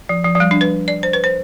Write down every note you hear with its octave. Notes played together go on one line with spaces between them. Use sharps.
F3
F3
F3
G3
D4
B4
D5
C5
B4
C5